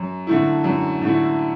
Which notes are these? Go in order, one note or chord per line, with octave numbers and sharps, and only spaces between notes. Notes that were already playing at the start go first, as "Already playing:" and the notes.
Already playing: F#2
D3 A3 E4
F#2
D3 A3 E4